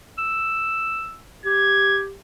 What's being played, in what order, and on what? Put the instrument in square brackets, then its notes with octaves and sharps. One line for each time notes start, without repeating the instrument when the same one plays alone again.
[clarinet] E6
[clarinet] G4 [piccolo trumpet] G#6